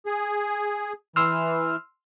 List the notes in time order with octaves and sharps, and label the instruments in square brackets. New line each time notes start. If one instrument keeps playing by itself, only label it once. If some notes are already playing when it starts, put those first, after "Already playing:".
[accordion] G#4
[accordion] E3 [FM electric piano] C6 E6 F6